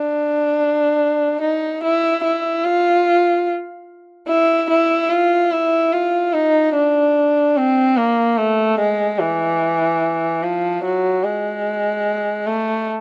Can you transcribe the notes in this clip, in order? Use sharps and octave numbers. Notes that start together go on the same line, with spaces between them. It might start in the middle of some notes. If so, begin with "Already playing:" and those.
Already playing: D4
D#4
E4
E4
F4
E4
E4
F4
E4
F4
D#4
D4
C4
A#3
A3
G#3
E3
F3
F#3
G#3
A3